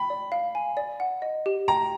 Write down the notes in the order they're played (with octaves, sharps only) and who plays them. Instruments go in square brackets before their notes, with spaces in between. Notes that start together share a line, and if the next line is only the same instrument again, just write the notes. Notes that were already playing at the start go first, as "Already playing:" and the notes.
Already playing: [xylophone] G5 [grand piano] B5
[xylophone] D5
F5
G#5
D5
F#5
D#5
G4
[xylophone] G5 [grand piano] A#5